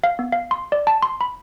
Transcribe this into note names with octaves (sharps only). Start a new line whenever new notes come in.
F5
B3
F5
C6
D5
A5
C6
B5